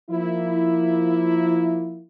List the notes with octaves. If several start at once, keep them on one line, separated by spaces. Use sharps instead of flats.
F3 A#3 E4